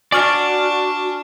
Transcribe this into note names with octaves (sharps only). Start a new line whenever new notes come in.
D4 F#4 D5 G#5 C#6 F6